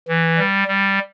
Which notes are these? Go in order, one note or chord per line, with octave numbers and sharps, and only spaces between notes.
E3
G3
G3